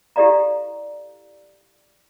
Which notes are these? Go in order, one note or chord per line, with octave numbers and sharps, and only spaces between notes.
E4 G4 A4 D5 F5 A#5